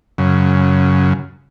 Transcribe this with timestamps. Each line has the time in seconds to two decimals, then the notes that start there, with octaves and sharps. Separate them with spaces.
0.18 F#2 C#3